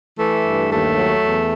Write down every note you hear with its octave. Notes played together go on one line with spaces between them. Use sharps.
E3 A3
G2
D#2 A3
F#3
E2